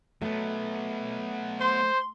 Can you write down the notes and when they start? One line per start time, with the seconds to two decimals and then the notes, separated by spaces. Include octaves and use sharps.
0.22 F#3 A3 B3
1.60 C5 C6